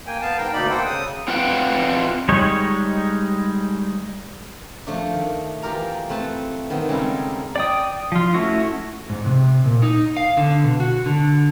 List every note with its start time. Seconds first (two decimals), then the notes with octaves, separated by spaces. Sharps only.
0.07 A#3 G5 G#5
0.22 B3 F5 A5
0.38 G#2 A#4 G5
0.53 D2 B2 A#3 D#4 D5 B5
0.69 A#3 A4 C5 F#5 G5
0.86 C#3 D#6
1.28 C4 F4 B4 F#5 G5
2.29 G3 G#3 D#4 C#5
4.87 F3 A3 D4
5.13 D#3
5.62 E3 F4 G4 A#4 A#5
6.09 A3 C4 B4 A5
6.70 D#3 B3 C4
6.88 C#3 G3 G#3 C4 D#4 A4
7.56 D5 G5 D#6
8.12 F3 F4
8.34 A3 C#4 E4 F#4
9.10 G#2
9.26 C3
9.66 A#2
9.82 D#4
10.17 F5
10.37 D3
10.64 B2
10.80 F#4
11.06 D3